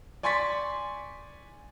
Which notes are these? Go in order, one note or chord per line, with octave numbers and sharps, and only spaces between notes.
D5 G#5 C6 C#6 A6 B6